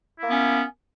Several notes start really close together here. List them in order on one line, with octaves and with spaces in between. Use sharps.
E4 A#3 B3 C#4